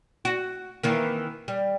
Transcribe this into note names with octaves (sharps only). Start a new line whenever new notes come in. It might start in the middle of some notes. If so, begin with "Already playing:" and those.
F#4
D#3 E3 A#3
G3